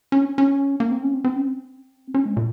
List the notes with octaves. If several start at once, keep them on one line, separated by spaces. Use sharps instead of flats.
C#4
C#4
A#3
C4
C#4
C4
C4
C#4
C4
C#4
G#3
A#2